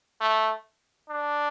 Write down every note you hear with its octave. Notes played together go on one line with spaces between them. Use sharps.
A3
D4